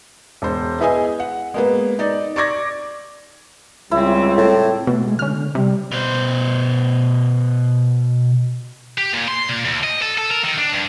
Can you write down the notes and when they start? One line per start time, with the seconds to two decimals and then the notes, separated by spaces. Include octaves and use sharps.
0.42 E1 C5
0.80 B3 E4 G#4 D#5 G#5
1.20 F#5
1.54 G#3 A#3 B3
1.99 D#4 D5
2.36 D5 C#6 D6 G#6 A#6
3.91 C#2 G3 C4 E4
4.38 A2
4.87 B2 A3
5.03 G#3
5.19 D3 C#4 F6
5.34 D3
5.55 C3 G3
5.91 B2 C5
8.98 G4
9.14 A#2
9.28 C6
9.49 A#2
9.65 D2
9.84 D#5
10.02 A4
10.18 A4
10.31 A#4
10.44 D#3
10.58 D4
10.72 G2